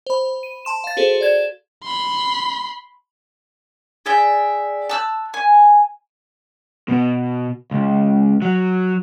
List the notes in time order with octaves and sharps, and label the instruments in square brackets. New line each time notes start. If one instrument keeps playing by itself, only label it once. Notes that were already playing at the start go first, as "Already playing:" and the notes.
[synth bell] C5 B5
D#7
A5 C6 E7
F5 A6
F#4 G#4 A4 C5
D5 G#6 E7
[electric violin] B5 C6
[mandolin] G#4 D5 E5 G5
A5 E6 F#6
G#5
[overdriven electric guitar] B2
C#2
F#3